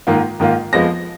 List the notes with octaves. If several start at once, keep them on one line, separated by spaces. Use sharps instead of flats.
G#2 D#3 A#3 F4
G#2 D#3 A#3 F4
F2 F3 G#3 B3 F4 A#6